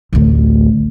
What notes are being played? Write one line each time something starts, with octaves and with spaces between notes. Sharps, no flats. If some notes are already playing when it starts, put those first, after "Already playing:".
A1 D2